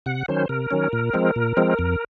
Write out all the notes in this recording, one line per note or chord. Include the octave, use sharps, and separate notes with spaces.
C3 F#5
D#3 F#3 C#4 C5
C3 A#4
D#3 F#3 C#4
A#2
F3 G#3 C4
A#2
F3 G#3 C4
F2